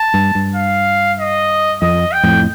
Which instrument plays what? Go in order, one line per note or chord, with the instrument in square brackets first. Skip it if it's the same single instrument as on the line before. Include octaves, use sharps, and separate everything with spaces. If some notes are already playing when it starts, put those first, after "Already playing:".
Already playing: [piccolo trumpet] A5
[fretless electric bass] G2
G2
[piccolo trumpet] F5
D#5
[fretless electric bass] F2 [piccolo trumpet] D#5
[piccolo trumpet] G5
[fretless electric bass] F2 A2